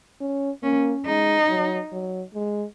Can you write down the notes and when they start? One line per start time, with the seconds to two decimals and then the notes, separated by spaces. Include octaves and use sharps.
0.21 C#4
0.63 A#3 C#4
1.06 G#3 D#4
1.49 F#3
1.93 F#3
2.34 G#3